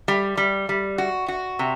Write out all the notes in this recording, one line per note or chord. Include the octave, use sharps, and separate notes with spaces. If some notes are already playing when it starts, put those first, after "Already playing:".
G3
G3
G3
F#4
F#4
C3